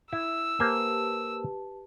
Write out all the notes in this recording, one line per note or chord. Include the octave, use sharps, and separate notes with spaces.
E4 E6
A#3 G4 B4 C5 G#5 A5